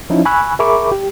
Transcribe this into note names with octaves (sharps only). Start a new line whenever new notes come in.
F3 C#4 D#4 E4
G#5 B5 C#6 E6 F#6
G#4 A#4 E5 B5 C#6 D6
G4